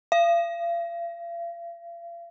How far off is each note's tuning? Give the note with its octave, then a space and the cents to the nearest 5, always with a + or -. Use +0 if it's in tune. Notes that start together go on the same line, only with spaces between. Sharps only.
F5 -40